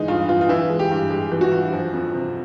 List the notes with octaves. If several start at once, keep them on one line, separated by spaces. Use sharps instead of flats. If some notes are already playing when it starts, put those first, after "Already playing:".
Already playing: E3 G#3 D#4
G2 F4
E3 F4
F4
E3 E4
G#3
G4
G2
G#3 G4
E3
F#4
G2
F3
F2
C3